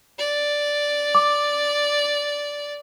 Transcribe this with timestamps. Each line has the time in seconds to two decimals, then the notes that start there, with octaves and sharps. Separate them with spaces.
0.18 D5
1.15 D6